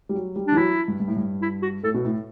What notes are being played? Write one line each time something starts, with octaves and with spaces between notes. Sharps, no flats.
G3
F#3
G3
E3 D4
F#3 E4
G2
G2
A2
G2
E4
F#4
A2 A4
B2
A2